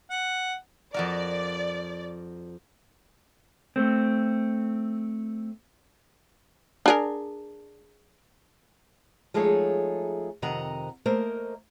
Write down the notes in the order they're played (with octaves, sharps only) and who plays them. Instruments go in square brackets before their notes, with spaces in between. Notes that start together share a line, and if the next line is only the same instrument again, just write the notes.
[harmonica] F#5
[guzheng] F2 F#4 A#4 [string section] D5
[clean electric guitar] A3 C4
[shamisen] D4 G#4 A#4
[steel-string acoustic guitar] F3 G#3 A3 D#4 G#4 C#5
F2 C3 D#3 D#5 F#5 A#5
A3 A#3 A#4 C5 D#5